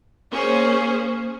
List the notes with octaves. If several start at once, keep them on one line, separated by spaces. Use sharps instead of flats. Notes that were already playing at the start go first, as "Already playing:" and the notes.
A#3 C#4 G#4 C5